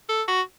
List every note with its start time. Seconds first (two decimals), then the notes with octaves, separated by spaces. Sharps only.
0.09 A4
0.28 F#4